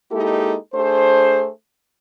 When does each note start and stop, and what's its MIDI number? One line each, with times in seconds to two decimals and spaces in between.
0.12 0.55 56
0.12 0.55 58
0.12 0.55 63
0.12 0.55 64
0.12 0.55 67
0.12 0.55 69
0.74 1.49 57
0.74 1.49 62
0.74 1.49 68
0.74 1.49 72